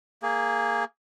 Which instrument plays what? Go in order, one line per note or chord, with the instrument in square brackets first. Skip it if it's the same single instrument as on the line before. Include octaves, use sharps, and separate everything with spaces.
[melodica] A#3 G#4